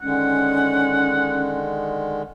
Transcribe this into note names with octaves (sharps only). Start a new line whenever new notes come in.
D3 D#3 G#3 C#4 F#5